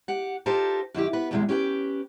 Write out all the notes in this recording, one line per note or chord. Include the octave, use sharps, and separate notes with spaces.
G4 F#5
D#4 F4 G4 A4 A#4 C5
F#2 D#3 E4 G4
B3 B4
E2 G2 C3 D#3 G#3
C#4 G4 B4 G5